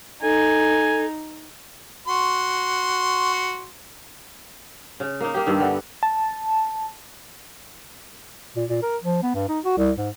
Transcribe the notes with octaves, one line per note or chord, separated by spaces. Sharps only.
D#4 A4 G#5
F#4 C6
C#3
A#3 D#4
A#3 G4
G2 D#3 E5
D3 B3
A5
A#2
A#2
A#4
F3
B3
G2
D#4
F#4
C2
G#2